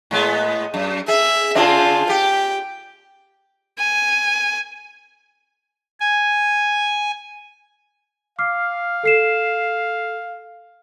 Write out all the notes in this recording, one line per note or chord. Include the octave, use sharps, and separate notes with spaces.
A2 G#3 B3
F#2
G#4 E5
C#3 C4 D4 F4 G#4
G4 G5
G#5
G#5
F5 D6 F6 C7
A4 C7 E7